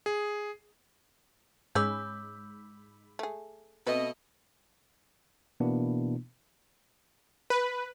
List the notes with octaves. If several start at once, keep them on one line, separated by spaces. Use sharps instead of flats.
G#4
G#2 G#3 C#4 G#4 B5 D6 E6 G6
A3 G#4
B2 A3 C4 B4 D#5
B2 E3 A#3 B3 D4 E4
B4